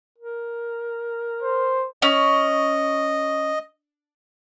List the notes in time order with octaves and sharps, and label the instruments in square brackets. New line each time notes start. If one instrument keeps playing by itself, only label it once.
[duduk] A#4
[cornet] C5
[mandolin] C#4 [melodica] D#5